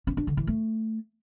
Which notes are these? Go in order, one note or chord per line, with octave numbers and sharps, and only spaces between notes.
C#4
D4
D3
E3
A3